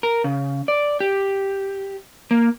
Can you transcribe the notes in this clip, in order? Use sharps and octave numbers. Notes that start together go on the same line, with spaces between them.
A#4
C#3
D5
G4
A#3